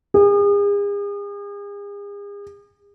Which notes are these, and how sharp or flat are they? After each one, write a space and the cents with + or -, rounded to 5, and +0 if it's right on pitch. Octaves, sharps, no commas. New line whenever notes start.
G#4 -40